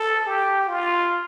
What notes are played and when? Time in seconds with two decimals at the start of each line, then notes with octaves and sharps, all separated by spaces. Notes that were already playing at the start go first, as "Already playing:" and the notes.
Already playing: A4
0.26 G4
0.68 F4